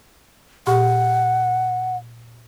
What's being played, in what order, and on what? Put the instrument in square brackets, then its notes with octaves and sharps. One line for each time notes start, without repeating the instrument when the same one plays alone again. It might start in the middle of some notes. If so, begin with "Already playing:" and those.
[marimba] A#2 G4 C#6 [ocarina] F#5